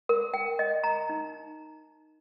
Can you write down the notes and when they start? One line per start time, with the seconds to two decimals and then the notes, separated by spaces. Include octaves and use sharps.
0.09 A#4
0.34 G5
0.59 D#5
0.84 A#5
1.09 D#4